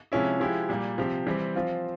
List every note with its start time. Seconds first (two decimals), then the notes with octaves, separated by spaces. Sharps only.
0.12 C3 F3 G#3 C#4 E4
0.40 F3 G#3 E4 G4
0.69 A#2 G3 A#3
0.98 C3 F3 C4 G4
1.26 E3 G3 C4 G4
1.55 F3 C4 F4